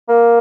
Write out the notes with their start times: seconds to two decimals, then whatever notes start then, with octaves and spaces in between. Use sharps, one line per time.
0.09 A#3